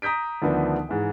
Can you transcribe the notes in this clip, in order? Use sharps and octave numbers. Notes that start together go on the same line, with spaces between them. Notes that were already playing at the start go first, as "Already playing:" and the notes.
A#5 D#6 G6 B6 D7
D2 D#3 F3 B3 D4
G#2 E3